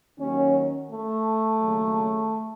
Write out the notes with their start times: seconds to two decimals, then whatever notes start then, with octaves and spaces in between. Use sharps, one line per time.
0.19 D#2 D#3 F#3 C#4
0.90 A3
1.60 D#2 C#3 F#3